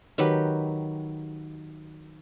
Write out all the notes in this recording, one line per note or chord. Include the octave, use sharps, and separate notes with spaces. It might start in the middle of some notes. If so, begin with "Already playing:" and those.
D#3 F#3 G4 B4